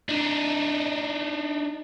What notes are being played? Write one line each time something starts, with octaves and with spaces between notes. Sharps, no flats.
D4 D#4